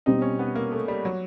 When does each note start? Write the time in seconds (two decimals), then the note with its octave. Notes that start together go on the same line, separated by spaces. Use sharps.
0.06 B2 G3 C4 D#4
0.22 C#4
0.39 B3
0.55 A#3
0.72 A3
0.88 G3
1.05 F#3